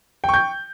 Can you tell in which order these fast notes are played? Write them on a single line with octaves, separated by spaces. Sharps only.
G5 C#6 G6